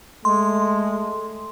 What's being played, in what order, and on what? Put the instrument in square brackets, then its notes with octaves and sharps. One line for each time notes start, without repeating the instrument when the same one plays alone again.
[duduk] G#3 [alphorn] A3 [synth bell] C6